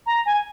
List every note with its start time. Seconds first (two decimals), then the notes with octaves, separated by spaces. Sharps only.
0.06 A#5
0.26 G#5